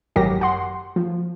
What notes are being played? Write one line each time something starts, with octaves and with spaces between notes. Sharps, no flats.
G#1 F#2 F#3 G4 A#4 A#6
F#5 C6
F3